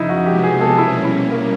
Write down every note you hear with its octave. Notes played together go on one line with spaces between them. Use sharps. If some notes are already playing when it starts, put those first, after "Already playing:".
Already playing: F#2 C#3 F3 D#4 E4
F#4
C3 F3 G#3 B3 G4
G#4
A4
B2 G3 A#3 C#4 E4
E4
A#3